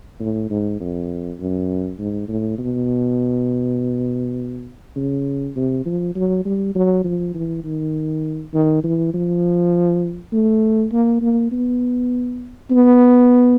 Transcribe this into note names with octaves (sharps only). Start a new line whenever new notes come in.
A2
G#2
F2
F#2
G#2
A2
B2
C#3
C3
F3
F#3
G3
F#3
F3
E3
D#3
D#3
E3
F3
A3
A#3
A#3
B3
B3